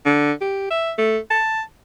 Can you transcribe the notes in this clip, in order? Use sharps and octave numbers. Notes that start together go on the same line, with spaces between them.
D3
G4
E5
A3
A5